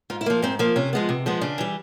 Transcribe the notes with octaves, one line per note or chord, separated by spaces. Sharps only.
G#2 F4
E4
F3 A#3
G#2 C4
F3 A#3
C3 C#4
F3 G#3 B3
C3
F3 G#3 B3
C#3 D4
E3 G3